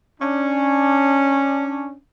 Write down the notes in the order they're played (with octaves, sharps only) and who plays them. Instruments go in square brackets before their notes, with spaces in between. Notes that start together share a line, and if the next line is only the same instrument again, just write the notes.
[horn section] C#4 D4